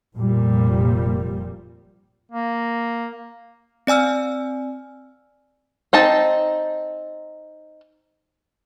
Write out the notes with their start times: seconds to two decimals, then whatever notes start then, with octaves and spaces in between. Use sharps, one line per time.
0.15 F1 A#2 G3
2.32 A#3
3.87 C4 D5 G#5 E6 F6
5.93 C4 D#4 A5